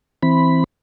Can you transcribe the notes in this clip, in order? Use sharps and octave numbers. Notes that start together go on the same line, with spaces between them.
E3 C4 B5